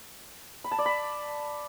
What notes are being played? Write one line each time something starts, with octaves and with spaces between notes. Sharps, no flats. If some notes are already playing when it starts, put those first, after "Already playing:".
B5
A5
D5
B5